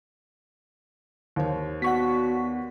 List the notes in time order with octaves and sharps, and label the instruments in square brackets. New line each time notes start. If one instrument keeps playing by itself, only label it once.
[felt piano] D#2 C5 C#5
[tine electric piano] B3 D5 [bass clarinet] F#4 [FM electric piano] F#5 C#6 B6